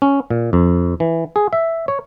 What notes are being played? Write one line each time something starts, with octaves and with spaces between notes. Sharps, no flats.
C#4
A#2
F2
E3
G#4
E5
C#5